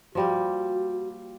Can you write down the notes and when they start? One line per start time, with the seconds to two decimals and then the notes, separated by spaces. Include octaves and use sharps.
0.15 F3 G3 A#3 F#4